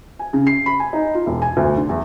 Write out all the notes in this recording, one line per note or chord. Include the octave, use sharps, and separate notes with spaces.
G#5
C#3
C7
B5
G#5
D#4
F4
E1
G#5
D2
D3
E2